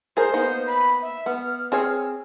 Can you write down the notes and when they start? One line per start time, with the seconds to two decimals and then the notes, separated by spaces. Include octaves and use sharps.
0.17 G#4 A#4 C5
0.34 A#3 B3 D#4
0.67 B5
1.02 E5
1.26 B3 F6
1.72 C4 G#4 C#5